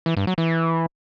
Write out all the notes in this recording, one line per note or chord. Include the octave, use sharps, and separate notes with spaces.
E3
G2
F#3
E3